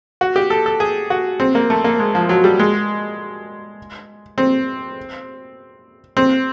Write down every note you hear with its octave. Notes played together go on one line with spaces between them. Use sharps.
F#4
G4
A4
A4
G#4
F#4
C4
A#3
A3
A#3
G#3
F3
F#3
G3
G#3
C4
C4